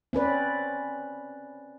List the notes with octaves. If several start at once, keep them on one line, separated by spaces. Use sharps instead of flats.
C4 C#4 B4 D5